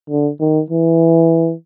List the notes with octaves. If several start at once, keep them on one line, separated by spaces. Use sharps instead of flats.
D3
D#3
E3